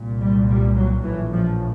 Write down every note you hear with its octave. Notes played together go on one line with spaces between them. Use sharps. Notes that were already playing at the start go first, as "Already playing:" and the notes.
Already playing: C2 A#2
G3
G3
F#3
A#1 A2 E3
F3